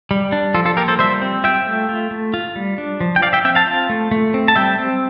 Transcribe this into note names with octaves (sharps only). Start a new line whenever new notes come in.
G3
D4
F3 F4 A4
F4 A4
A#3 G4 A#4
A4 C5
G3 C5 E5
C4
F4 E5 G5
A3
F4
A3
F4
G3
D4
F3
G5
F3 D5 F5
E5 G5
C4 E5 G5
F5 A5
F4
A3
A3
C4
A5
G3 E5 G5
C4